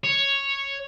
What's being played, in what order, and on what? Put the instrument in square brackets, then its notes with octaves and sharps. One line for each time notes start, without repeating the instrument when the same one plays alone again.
[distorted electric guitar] C#5